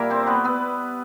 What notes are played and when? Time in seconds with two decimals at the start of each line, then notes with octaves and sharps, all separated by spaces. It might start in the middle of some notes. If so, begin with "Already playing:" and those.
Already playing: A#2 G3 A#3 E4 A#4
0.10 C4 C5
0.27 B3 B4
0.44 B3 B4